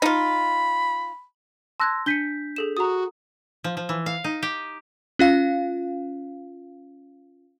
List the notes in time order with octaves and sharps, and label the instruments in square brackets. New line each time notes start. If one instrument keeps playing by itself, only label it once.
[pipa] D#4 F4 [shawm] B5
[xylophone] A5 F#6 G#6 [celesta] C6 E6 A#6
[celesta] D4 G6 B6 [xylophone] C#7 D#7 G7
[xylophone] G#4 A4 E7
[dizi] F#4 [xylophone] A#5 D#6
[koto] F3
F3
E3
F5
D#4
G4
[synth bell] C#4 F4 F5